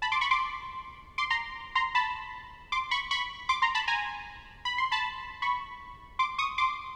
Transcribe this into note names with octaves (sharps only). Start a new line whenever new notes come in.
A5 B5
C6 D6
B5 C#6
C6 D6
C6 D6
A#5 C6
A#5 C6
A5 B5
C6 D6
B5 C#6
B5 C#6
C6 D6
A#5 C6
A5 B5
G#5 A#5
B5
C6
A5 B5
B5 C#6
C6 D6
C#6 D#6
C6 D6